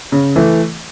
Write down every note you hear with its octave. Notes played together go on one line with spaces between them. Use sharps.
C#3
E3 A3